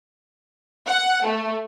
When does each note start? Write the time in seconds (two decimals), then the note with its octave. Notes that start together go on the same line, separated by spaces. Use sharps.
0.87 F#5
1.25 A3